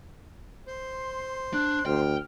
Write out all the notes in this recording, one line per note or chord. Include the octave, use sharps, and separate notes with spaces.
C5 C6
D4 F#6
D2 G5 F6